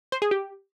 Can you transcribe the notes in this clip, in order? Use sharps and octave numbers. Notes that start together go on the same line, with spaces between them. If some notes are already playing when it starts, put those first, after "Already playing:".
C5
G#4
G4